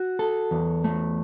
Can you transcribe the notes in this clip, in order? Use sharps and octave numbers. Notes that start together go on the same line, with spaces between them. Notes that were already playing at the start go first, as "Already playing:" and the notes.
Already playing: F#4
A4
E2
A3